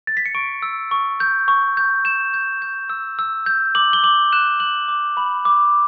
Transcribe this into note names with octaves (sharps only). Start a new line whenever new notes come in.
A6
B6
C#7
C#6 D7
E6
C#6
G6
C#6
G6
G6 E7
G6
G6
E6
E6
G6
D6 F#7
G7
D6 F#7
F#6 E7
F#6 F#7
D6
B5
D6